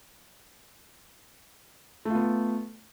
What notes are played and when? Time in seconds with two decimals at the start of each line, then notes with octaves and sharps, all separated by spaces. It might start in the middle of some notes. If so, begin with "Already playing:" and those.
2.05 A3
2.10 F4
2.15 B3